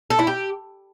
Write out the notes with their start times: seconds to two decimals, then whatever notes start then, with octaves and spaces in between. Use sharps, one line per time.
0.10 A4
0.19 E4
0.27 G4